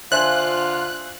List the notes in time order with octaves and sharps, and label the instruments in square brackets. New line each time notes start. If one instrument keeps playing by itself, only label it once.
[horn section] D3 F4 [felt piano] C5 E5 G#5 [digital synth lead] F#6